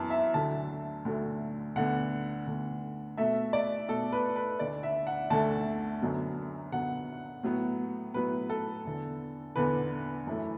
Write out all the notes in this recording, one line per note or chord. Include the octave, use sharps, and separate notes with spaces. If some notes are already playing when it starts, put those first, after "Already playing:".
Already playing: F#2 E3 B3 A5
E5
D2 D3 F#3 A3 A5
D2 D3 F#3 A3
D2 D3 B3 F#5
D2 D3 B3
B2 A3 E5
D5
B2 A3 A4
B4
B4
D2 D3 A3 D5
E5
F#5
D2 D3 A3 A5
F#2 D3 F#3 B3
F#2 D3 F#3 B3 F#5
A2 F#3 B3
A2 F#3 B3 B4
A4
E2 D3 B3
E2 D3 B3 B4
F#2 E3 A3